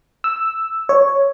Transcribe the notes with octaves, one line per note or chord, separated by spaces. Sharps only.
E6
C#5